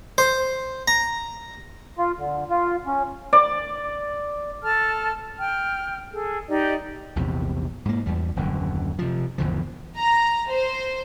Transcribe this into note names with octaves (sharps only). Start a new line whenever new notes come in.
C5
A#5
F4
D3
F4
C#4
D5
A4 A5 F6
G5 F6
G#4 A4
D#4 G4 D5 D#5
A#1 E2 C3
G#2 A#3
E2 G3
D#1 F#2 D3
C3 F3
G#1 E2 D3 F3
A#5
C5